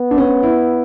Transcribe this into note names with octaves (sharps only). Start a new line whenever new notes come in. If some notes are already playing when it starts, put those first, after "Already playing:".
Already playing: B3
D4
C#4
E4